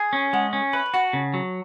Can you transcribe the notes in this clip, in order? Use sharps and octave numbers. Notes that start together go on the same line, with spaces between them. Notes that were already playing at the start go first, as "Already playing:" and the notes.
Already playing: G#4 G#5 B5
C#4
G#3 F#5 A5
C#4
B4 C#5 E5
G#5
F#4 F#5 A5
C#3
F#3